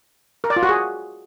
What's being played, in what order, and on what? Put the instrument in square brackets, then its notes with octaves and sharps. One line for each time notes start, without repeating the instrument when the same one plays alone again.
[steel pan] A#4
D5
F4
F#4
G#4